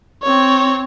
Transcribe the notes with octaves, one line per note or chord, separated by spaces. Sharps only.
C4 C#5